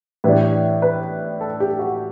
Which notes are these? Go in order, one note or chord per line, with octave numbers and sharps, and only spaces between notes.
A2 E3 G3 D4 B4
B4
A4
G4
F#4